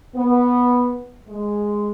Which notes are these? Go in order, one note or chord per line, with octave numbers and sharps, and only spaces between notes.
B3
G#3